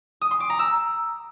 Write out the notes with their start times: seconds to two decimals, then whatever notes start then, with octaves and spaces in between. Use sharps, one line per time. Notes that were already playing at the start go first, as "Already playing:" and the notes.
0.21 D#6
0.31 C6
0.40 D6
0.50 A#5
0.59 E6